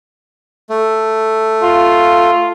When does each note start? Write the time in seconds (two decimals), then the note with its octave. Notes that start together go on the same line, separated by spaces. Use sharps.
0.70 A3
1.63 F4